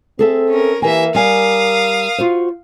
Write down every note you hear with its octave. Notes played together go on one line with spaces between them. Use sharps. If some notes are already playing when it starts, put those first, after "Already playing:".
C4 G#4 A4 E5
C#4 A#4
E3 A#3 G4 A#4 E5 G#5
G3 A#4 F5 G#5 D#6
F4 F#4 C5